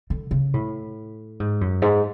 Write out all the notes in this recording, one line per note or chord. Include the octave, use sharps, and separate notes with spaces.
D3
C#3
A2
G#2
F#2
G#2